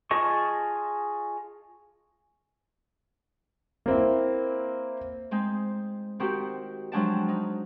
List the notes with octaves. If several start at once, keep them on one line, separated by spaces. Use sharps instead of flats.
F4 G#4 D#5 A5 C#6
A#3 C4 E4
G#3 C4 D#4
D#3 C4 D#4 F#4 G4
F3 F#3 G#3 D4 G5 A5
D#4